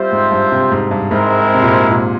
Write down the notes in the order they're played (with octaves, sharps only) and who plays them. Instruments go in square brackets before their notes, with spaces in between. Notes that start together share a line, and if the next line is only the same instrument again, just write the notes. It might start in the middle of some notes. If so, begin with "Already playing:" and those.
Already playing: [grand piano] G3 [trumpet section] C4 F4 C5 E5
[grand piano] G#2
G2
C3
G#2
G2
[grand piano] G#2 [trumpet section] G#3 C4 E4 A#4
[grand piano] C3
A#2
G#2
A#2